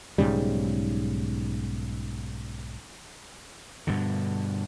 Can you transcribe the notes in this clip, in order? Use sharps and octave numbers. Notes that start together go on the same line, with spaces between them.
B1 G#2 C#3 G3
G2 B2 D3